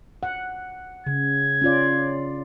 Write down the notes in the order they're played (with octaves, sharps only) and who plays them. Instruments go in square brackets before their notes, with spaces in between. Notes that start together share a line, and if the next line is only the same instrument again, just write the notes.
[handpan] F#5
[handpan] C#3 [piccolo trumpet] G#6
[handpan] C#4 F4 D5